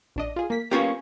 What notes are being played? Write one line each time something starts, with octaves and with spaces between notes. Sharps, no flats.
A#1 D4 D#5
F4 G#4
A#3 B6
A#3 B3 C#4 F4 G4 C#5